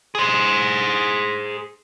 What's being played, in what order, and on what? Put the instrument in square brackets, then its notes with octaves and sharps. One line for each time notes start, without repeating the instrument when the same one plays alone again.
[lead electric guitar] G#4 C5